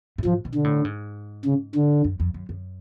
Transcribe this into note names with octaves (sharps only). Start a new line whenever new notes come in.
A2
G#2 F3
B2
D3
A2
G#2
C#3
D3
F#2
F2
F#2
F#2